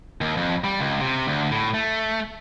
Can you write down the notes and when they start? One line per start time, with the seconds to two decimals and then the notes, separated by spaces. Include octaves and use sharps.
0.21 D#2
0.37 F2
0.64 G3
0.79 C#2
1.01 C3
1.27 D2
1.51 A2
1.74 A3